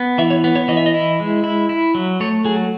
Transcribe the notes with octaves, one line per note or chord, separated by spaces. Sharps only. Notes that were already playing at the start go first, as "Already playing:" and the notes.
Already playing: B3
E3 E5
C#5
B3
C#5
E3 D#5
E5
D#5
E4
G#3
E4
E4
F#3
A3 C#5
F#3 G#4